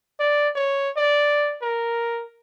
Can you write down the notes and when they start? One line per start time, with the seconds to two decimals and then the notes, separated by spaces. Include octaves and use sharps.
0.20 D5
0.56 C#5
0.97 D5
1.62 A#4